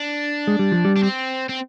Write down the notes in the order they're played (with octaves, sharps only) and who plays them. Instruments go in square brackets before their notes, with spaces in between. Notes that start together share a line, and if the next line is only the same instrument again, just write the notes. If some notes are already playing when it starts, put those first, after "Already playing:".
Already playing: [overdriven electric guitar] D4
[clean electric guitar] G#3
G3
F3
G3
[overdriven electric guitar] D4
C4
C4